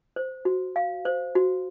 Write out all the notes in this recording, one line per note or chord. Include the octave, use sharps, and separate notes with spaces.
C5
F#4
F5
C5
F#4